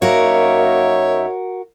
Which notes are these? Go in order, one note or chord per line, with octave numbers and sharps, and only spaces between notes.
F#2 A#3 D#4 F#4 A#4 C#5 E5